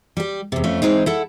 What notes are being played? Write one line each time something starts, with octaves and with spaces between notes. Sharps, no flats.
G3 G4
E2 C3
F2 A3 C#4
E3 G#3 C4 D#4
E4 A4 F#5